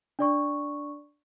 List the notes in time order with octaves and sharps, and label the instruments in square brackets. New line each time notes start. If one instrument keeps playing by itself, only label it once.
[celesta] D4 D5 C#6